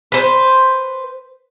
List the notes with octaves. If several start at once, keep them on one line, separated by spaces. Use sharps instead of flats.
B4 C5